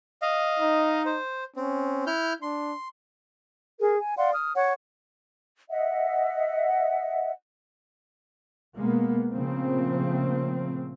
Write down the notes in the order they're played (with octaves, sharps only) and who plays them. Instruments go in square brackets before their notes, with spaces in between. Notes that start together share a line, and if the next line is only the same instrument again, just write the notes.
[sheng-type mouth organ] D#5 F5
[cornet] D#4
[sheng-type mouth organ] C5
[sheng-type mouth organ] C4 [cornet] C#4
[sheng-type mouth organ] E4 F6 G6
[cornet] D4 [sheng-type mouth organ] C6
[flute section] G#4 A#4
G#5
D5 F5 F#5 C6
D#6 F6
C#5 F#5 C#6
D#5 E5 F#5
[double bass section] B2 G#3 A#3 B3
A#2 C#3 F3 A3 A#3 C4